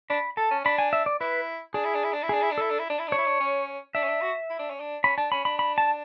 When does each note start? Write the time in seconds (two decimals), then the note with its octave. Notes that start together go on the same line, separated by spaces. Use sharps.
0.10 D4 B5
0.37 A4 A5
0.51 C#4
0.65 D4 B5
0.79 G#5
0.93 E5
1.06 D5
1.21 E4 B4
1.74 D4 G#4
1.85 E4
1.95 D4
2.04 E4
2.13 D4
2.23 E4
2.29 D4 G#4
2.42 E4
2.51 D4
2.58 E4 A4
2.71 D4
2.79 E4
2.90 D4
2.99 E4
3.08 D4 C#5
3.18 E4
3.27 D4
3.40 C#4
3.95 D4 E5
4.04 C#4
4.09 D4
4.21 F#4
4.50 E4
4.59 D4
4.70 C#4
4.80 D4
5.04 C#4 B5
5.18 D4 A5
5.32 C#4 B5
5.45 D4 B5
5.59 B5
5.78 A5